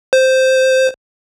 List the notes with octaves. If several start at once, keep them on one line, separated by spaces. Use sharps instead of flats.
C5